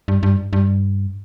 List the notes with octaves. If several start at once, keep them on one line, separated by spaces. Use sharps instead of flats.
G2
G2
G2